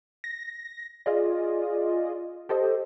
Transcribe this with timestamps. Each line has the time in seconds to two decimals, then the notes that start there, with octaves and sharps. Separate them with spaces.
0.24 A#6
1.06 F4 G#4 D5 D#5
2.49 G4 A4 C5 D#5